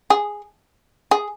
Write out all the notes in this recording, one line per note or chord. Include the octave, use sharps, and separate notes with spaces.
G#4
G#4